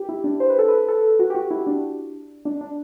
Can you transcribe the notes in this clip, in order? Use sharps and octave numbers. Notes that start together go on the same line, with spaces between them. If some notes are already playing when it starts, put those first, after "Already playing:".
Already playing: G4
E4
D4
C5
B4
A4
B4
A4
F#4
G4
F#4
E4
D4
D4
D4